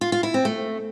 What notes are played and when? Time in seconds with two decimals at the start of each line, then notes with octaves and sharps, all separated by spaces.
0.01 F4
0.12 F4
0.23 E4
0.34 C4
0.45 A3